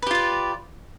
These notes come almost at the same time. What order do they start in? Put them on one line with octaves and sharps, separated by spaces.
B4 G4 F4 D5